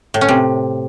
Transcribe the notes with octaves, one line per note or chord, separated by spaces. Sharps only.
A2
C#4
C3